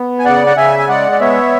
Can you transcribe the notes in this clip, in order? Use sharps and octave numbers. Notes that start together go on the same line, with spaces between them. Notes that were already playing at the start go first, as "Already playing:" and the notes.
Already playing: B3
G#5
C#3 D5 F#5
F#5
C#3 E5 G#5
G#5
G#3 D5 F#5
D5
B3 C#5 E5